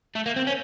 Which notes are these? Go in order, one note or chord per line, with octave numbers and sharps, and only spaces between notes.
A3
A#3
C4
C#4